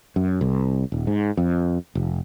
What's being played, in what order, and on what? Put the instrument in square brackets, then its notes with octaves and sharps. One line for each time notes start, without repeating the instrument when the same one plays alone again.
[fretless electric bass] F#2
C2
D#1
G#2
F2
F1